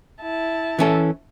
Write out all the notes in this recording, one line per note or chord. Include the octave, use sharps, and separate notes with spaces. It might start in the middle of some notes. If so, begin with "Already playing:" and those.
E4 A5
E3 C#4 A4